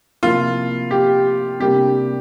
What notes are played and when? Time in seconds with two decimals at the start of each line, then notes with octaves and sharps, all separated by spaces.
0.23 C3 F3 A#3 E4 F4
0.91 G4
1.60 C3 G3 A#3 D4 G4